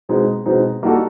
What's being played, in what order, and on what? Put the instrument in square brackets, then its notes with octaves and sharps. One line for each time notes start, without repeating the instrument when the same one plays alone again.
[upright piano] B2 G#3 C4 D#4
B2 G#3 C4 D#4
G3 A#3 D#4 F#4 A4